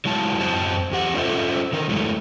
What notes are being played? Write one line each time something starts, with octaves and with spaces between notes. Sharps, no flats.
F#3 G#3 E4 A5
F#2 F#3 C4 F#4 C5 A5
E2 G4 F#5
C#4 D4 F4 A4 C5 E5
D3 D#3 A#4
F#3 G#3 A3 E4